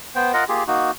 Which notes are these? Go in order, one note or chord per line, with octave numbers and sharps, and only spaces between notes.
B3 C5 G5
F4 A#4 D#5 F#5
A#3 F4 G4 G#4
A#3 D#4 F#4